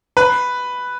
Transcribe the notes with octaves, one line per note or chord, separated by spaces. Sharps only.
B4